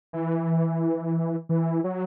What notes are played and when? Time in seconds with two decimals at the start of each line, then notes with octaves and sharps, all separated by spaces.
0.13 E3
1.49 E3
1.84 F#3